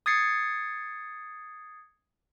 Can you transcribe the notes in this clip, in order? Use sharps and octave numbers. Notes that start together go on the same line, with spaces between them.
D#6 G#6 A6 C7 C#7